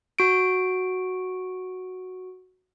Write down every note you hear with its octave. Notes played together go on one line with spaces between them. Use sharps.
F#4 D7